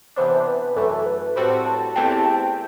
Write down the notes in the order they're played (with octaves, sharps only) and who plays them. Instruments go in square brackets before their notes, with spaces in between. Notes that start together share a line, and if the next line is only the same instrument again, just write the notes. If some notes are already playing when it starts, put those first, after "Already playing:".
[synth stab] C3 E3 B3 D4 [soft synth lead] C5
[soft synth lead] C5
B4
[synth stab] F#2 E3 A3 [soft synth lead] A4
[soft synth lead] B4
[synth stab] A2 G3 C4 F#4 A4 [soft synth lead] C5
[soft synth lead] A5
[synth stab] E2 C3 E3 A3 C4 [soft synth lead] G5
[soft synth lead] A5
G5